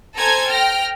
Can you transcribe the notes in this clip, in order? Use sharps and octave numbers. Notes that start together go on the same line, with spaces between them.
A4 C5 G#5 A#5 G#6
G5 F6 A#6